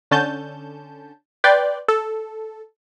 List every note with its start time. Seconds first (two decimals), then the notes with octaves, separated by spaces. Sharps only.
0.11 D3 C#4 A5 G6
1.44 B4 D5 G5 C6
1.88 A4